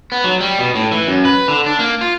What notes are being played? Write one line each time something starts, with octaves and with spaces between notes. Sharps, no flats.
B3
F#3
G3
B2
A2
E3
F#2
B4
D3
D4
A#3
F4